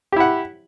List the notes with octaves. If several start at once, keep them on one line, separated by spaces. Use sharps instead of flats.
E4 G4 F#5